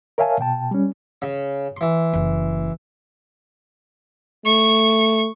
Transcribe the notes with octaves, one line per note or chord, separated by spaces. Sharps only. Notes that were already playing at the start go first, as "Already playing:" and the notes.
A#4 C#5 E5 F5 G#5 A5
B2 G5 A5
G3 C#4
C#3
E3 C6
F#1 E4
A3 C#6